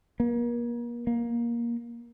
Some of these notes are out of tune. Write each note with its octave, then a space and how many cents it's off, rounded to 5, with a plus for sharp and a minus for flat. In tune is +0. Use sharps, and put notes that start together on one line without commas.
A#3 +35
A#3 +15